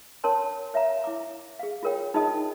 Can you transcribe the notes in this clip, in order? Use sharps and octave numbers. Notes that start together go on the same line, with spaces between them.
C#4 A#4 C#5 A5 C6
C#5 E5 F5 A#5
E4 D6
G#4 F5
F4 G#4 A#4 C#5 G5
D#4 F4 G#4 D#5 A5 D#6